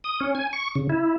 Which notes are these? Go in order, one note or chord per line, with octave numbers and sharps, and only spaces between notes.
D#6
C#4
G#5
C#6
C#3
E4